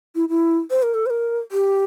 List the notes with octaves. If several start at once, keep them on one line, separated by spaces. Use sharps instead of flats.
E4
E4
C5
A#4
A4
C5
A#4
G4